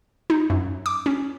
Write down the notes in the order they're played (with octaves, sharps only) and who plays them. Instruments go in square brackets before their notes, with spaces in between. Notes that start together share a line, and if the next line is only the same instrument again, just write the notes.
[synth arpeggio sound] D#4
F#2
D6
C#4